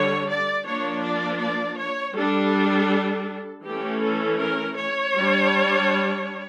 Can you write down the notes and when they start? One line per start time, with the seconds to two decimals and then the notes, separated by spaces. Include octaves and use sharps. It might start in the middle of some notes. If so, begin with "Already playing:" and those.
Already playing: D3 G3 D4 C#5
0.28 D5
0.65 F3 A#3 D4 C#5
1.03 D5
1.40 D5
1.78 C#5
2.16 G3 D4 A4
3.65 E3 A3 C#4 G4
4.02 A4
4.40 A#4
4.78 C#5
5.15 G3 D4